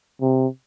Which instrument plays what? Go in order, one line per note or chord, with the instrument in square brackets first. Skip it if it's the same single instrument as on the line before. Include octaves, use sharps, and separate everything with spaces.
[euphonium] C3